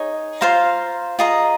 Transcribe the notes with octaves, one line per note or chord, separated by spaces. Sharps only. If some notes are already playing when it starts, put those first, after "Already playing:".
Already playing: D#4 G#4 C#5
F4 C5 F5 A#5
F4 G#4 D#5 A#5